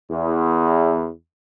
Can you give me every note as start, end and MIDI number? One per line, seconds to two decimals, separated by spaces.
0.11 1.09 40